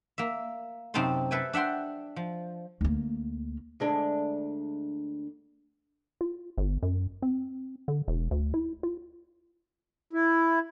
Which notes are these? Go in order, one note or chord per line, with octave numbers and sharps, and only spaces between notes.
A#3 E5
F#2 C3 C4 D#4 A5 C6
A4 B4 E5 G5 G#5
D4 E5 F#5 G5 C6
F3
D2 A#3
D2 G#3 D4
F4
G1
F#2
C4
D3
E1
D2
E4
F4
E4